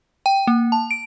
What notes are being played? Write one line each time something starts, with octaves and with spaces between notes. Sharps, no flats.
G5
A#3
A5
D7